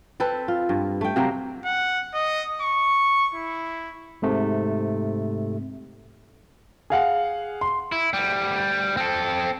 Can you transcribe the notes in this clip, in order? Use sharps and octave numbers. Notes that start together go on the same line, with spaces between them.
C4 A4 B4
F4
G2
A3 G5
C3 F#3 A#3 C4
F#5
D#5
C#6
E4
G#2 C3 A3
G#4 F5 F#5
C6
E4
D2 G3
C4 A4